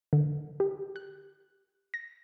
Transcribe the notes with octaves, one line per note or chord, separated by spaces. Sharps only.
D3
G4
F#6
A#6